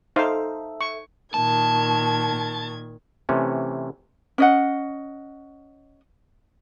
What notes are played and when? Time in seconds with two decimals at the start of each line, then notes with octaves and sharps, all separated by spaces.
0.16 D#4 A4 C5 E5 F5
0.81 C#6
1.34 A#2 D#3 A5 G#6
3.29 C3 E3 A3 C#4
4.38 C#4 D#5 F#5